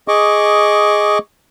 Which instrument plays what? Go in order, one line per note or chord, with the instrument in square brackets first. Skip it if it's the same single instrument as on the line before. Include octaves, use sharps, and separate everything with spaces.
[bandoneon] G#4 D#5 C#6 D6